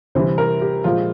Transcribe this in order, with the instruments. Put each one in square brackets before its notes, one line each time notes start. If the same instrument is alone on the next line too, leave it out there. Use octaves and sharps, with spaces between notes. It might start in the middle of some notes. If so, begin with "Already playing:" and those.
[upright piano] C3 E3 G3 C5
A#4
G4
A#2 F3 G#3 F4